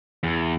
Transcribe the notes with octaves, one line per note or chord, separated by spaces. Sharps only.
E2